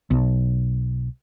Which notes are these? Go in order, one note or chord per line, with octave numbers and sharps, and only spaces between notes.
B1